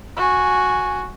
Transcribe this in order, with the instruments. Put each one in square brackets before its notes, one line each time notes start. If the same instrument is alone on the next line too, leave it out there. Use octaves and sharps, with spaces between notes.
[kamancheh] F#4 G#5